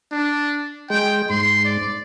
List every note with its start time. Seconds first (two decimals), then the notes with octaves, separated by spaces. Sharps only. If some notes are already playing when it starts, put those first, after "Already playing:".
0.11 D4
0.90 G#3 G5
1.30 G#2 C6
1.65 D5